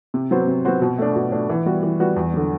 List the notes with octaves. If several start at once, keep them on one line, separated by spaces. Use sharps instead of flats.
C3
F#3 B3 F#4 C5
C3
F#3 B3 F#4 C5
B2
A3 D4
B2
A3 D4
E3
G3 B3 F#4
E3
G3 B3 F#4
E2
D3 F#3